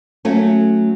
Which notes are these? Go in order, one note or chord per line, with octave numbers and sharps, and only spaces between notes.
F#3 A3 C#4